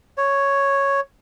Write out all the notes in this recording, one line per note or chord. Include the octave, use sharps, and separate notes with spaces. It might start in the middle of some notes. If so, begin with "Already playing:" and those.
C#5